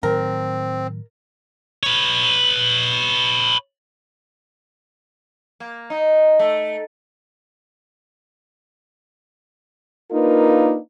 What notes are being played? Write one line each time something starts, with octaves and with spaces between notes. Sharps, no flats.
A2 D#3 F#3 C4 A#4
B4 C#5
A#3
D#4
A3
A#3 D4 D#4 F4 A#4 B4